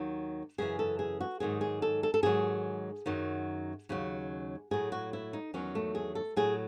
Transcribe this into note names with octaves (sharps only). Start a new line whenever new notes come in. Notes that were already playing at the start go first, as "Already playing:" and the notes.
Already playing: D#2 D#3 F#3
F#2 C#3 E3 G#4
A4
G#4
F#4
G#2 D#3 F#3 G#4
G#4
A4
A4
A4
G#2 D#3 F#3 G#4
F#2 D#3 F#3
D#2 C#3 F#3
A2 F#3 G#4
F#4
E4
D#4
E2 D#3 F#3 C#4
A3
G#4
A4
A2 F#3 G#4